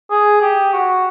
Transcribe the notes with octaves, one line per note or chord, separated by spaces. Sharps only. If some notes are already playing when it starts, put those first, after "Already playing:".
G#4
G4
F#4